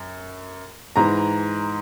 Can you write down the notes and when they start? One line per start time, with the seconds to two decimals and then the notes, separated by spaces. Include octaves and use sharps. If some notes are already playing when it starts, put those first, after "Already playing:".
Already playing: F#2
0.96 G#2 E3 A#5